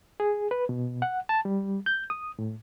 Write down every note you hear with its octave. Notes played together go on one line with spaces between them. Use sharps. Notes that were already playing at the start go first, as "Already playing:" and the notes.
G#4
B4
B2
F#5
A5
G3
G6
D#6
A2